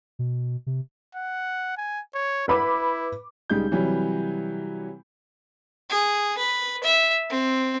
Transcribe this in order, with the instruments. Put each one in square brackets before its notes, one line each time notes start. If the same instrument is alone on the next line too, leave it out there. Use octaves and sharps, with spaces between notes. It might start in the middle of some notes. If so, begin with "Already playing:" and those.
[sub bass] B2
C3
[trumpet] F#5
G#5
C#5
[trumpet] E4 [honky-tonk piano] B4 B5 D6
[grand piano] C#2 G3 G#3 D#4 G6
C3 E3 F#3 G3
[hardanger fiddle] G#4
B4
E5
C4